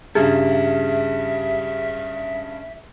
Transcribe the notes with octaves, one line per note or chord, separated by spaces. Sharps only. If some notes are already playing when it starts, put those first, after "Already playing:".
G2 C#3 G4 G#4 E5